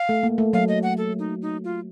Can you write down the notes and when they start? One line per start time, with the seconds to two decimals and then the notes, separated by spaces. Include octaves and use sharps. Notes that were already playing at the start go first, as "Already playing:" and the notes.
Already playing: F5
0.09 A3
0.23 A#3
0.38 A3
0.53 F#3 F5
0.68 D#5
0.83 F#5
0.97 A4
1.19 D#4
1.42 D#4
1.64 F4